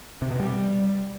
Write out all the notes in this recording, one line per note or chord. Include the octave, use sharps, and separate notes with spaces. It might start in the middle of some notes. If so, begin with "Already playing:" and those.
C3
B2
G3